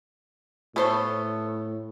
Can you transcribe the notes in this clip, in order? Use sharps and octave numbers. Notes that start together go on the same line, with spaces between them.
A2 A3 B3 A4 C5 C#5